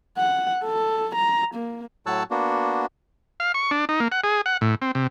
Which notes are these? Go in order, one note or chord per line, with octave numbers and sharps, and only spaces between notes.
F#5
A4
A#5
A#3
A2 F#3 C#5 A5 E6 F#6
A#3 B3 D4 F#4
F5
C#6
D4
D#4
A#3
F#5
G#4
F#5
A2
C4
C3